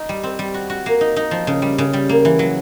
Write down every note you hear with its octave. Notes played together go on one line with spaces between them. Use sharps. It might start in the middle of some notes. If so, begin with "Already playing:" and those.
Already playing: D#4
G3
C4
G3
F#4
F#4
A#3
D#4
D#4
F3
C#3
G3
C#3
G3
A#3
E3
F#3